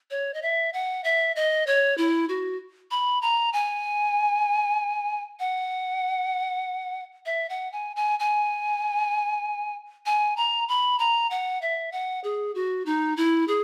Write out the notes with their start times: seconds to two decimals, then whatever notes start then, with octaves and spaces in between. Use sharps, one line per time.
0.11 C#5
0.34 D#5
0.42 E5
0.73 F#5
1.04 E5
1.36 D#5
1.67 C#5
1.98 E4
2.29 F#4
2.91 B5
3.22 A#5
3.53 G#5
5.40 F#5
7.26 E5
7.50 F#5
7.72 G#5
7.96 G#5
8.20 G#5
10.06 G#5
10.37 A#5
10.68 B5
10.99 A#5
11.31 F#5
11.62 E5
11.92 F#5
12.24 G#4
12.55 F#4
12.86 D#4
13.17 E4
13.48 G#4